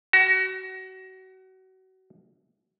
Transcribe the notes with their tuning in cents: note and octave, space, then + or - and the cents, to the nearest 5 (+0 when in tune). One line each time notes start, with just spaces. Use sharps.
F#4 +30